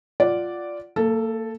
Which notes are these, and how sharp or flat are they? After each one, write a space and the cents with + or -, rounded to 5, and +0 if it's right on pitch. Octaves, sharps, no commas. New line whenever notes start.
F4 +0 D5 -5 F#5 +5
A#3 -35 A4 +0